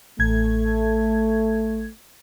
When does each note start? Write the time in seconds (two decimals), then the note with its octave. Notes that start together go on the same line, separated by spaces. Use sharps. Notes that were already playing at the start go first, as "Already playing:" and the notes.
0.19 A1 A3 G#6